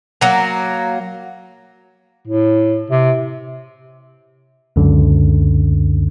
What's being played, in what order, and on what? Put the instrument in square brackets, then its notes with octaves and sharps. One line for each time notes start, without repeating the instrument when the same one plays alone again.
[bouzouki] F#3 A#3
[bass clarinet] A2
C3
[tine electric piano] C#2 F#2 D3